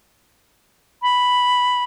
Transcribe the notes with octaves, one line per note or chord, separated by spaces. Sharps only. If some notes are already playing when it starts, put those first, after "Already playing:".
B5